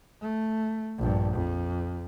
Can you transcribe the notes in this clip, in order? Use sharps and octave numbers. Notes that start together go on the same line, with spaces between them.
A3
A#1 G2
F2